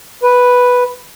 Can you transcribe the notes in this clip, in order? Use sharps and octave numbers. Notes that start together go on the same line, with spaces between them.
B4